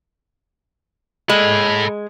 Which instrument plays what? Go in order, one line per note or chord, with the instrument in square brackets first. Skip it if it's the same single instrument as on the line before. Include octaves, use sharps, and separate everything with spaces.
[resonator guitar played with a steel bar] G#3 [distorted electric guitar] A4 B5